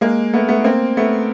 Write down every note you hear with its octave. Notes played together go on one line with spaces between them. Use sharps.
G#3 A#3
A3 B3
A3 B3
A#3 C4
A3 B3